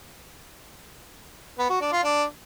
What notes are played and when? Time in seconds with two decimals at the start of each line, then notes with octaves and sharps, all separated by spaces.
1.58 B3
1.70 F#4
1.81 D4
1.92 F4
2.04 D4